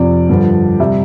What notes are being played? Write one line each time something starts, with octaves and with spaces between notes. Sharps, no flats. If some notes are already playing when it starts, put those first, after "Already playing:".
Already playing: F2 C3 F3 D5
G2 D3 F3
C3 G3 E5